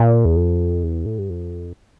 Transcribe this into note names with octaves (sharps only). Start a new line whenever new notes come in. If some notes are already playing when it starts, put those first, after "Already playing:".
Already playing: A#2
E2
F2
E2
A2
G2
F2